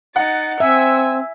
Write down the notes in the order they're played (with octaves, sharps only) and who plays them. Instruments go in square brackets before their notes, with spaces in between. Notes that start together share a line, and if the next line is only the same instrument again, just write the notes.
[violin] D#4 A6 [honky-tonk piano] F#5
[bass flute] C4 [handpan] E5 [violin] G#5 E6